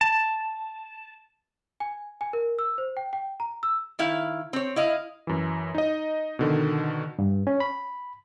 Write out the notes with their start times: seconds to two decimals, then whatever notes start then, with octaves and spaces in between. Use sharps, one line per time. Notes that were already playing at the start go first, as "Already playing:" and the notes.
0.01 A5
1.80 G#5
2.21 G#5
2.33 A#4
2.59 E6
2.78 C5
2.97 G5
3.13 G5
3.40 A#5
3.63 E6
3.99 D#3 E4 F5
4.53 C4 C#5
4.76 E4 D#5 F5
5.27 F#2 E3
5.75 D#4 D#5
6.39 B2 D3 D#3
7.19 G2
7.47 C#4
7.60 B5